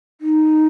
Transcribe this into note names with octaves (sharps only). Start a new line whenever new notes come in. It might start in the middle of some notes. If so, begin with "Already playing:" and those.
D#4